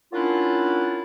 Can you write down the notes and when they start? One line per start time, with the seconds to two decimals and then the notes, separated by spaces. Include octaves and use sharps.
0.13 F#3 A#3 C#4 D4 E4 F4